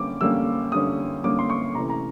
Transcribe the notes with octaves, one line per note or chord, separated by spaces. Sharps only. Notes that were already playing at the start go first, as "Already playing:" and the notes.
Already playing: D3 G3 A#3 C#4 D6
D3 G3 A#3 C#4 E6
D3 G3 A#3 C#4 D#6
D3 G3 A#3 C#4 D6
C6
C#6
C3 E3 A3 C#4 A#5
A#5